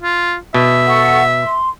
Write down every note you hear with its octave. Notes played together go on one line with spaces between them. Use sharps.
F4
B2 E5
A4 F#5 C#6
C6